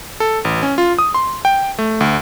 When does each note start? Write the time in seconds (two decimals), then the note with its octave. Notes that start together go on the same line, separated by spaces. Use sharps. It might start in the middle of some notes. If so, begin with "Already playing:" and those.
0.20 A4
0.45 A1
0.63 C#4
0.78 F4
0.99 D#6
1.14 C6
1.45 G5
1.79 A3
2.00 D2